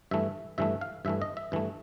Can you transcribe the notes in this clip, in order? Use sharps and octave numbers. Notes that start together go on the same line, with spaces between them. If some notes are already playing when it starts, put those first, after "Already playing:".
G2 E3 A3 E5
G2 E3 A3 E5
F5
G2 E3 A3 E5
D#5
E5
G2 E3 A3